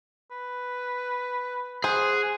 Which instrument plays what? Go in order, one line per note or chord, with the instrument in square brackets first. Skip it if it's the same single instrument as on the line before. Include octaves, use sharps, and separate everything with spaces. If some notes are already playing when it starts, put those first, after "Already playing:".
[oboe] B4
[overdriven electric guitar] G#4 [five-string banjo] C5 [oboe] F#5